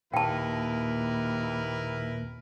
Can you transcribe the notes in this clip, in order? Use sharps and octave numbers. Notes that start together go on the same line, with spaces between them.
D#2 A#2 E4 A#4 B4 G5 A5